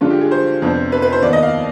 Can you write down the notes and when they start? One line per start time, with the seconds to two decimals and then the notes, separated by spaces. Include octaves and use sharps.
0.01 G2 D3 G#3 D4 F4
0.10 G4
0.21 G#4
0.31 C5
0.62 F2 C3 F3 B3 D4
0.92 B4
1.02 B4
1.12 C5
1.22 D#2 D#3 B3 D5
1.33 D#5
1.43 F5